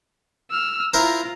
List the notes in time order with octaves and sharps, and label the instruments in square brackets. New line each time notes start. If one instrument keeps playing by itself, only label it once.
[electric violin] E6 F6
[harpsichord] E4 A#4 C5 [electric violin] F4 A#5